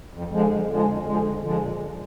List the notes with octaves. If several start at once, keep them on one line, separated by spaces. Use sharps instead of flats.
F2
D3 F3 G#3
F2
D3 F3 G#3
F2
D3 F3 G#3
F2
D3 F3 G#3
A#2